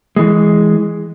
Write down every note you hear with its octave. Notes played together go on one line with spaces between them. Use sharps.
E3 G#3